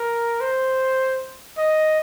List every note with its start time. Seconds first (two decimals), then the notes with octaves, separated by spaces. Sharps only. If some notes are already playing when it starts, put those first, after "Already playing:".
Already playing: A#4
0.41 C5
1.58 D#5